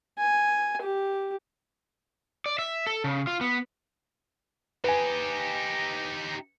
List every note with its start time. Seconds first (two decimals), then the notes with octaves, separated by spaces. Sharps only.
0.18 G#5
0.81 G4
2.46 D5
2.59 E5
2.87 A4
3.04 C#3
3.27 F4
3.41 B3
4.84 D#4 G4 B4 G#5